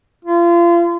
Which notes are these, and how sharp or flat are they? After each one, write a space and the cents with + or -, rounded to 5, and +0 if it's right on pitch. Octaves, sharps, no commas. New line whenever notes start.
F4 -30